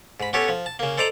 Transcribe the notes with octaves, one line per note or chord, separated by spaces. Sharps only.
G#2 B5
B3 C#4 G4 A4 C#5
F3
A5
C#3 A#3
A4 C5 D5 D#5 A#5